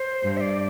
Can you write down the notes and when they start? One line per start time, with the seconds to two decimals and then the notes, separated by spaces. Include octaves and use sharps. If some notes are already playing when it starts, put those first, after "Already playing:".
Already playing: C5
0.23 G2
0.37 E5
0.40 D5